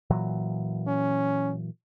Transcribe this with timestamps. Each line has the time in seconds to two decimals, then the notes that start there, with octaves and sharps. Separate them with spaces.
0.10 A#2 E3 F#3
0.87 C#4